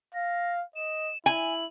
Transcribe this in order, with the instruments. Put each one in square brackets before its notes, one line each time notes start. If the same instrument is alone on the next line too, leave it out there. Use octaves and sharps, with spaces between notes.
[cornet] F5 [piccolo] A#6
[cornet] D#5 [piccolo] E7
[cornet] E4 [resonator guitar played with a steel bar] G#5 [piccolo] F#7